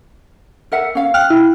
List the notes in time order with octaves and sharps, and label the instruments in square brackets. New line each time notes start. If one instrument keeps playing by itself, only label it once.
[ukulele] A#4 E5 F#5
C#4 F5
[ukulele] G5 [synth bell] F6 F#6
[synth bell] E4